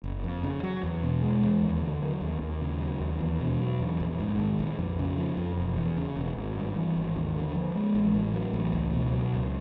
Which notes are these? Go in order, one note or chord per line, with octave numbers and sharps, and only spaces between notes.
F#1
F2
C#3
F#3
E2
B2
G#3
E2
D#2
D3
F#3
D#2
D#2
C#3
F#3
D#2
E2
B2
F#3
E2
A#1
G#2
D#3
A#1
F2
C#3
F3
F2
E1
E2
C#3
E1
G#1
G2
E3
G#1
D#2
D3
F3
G#3
A1
A2
F#3
A1
C#2
B2
F#3
C#2